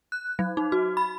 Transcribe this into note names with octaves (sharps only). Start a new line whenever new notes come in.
F#6
F#3
D#4
F#4
B5